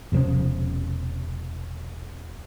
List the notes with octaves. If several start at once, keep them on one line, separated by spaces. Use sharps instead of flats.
E1 C3 F3 C#4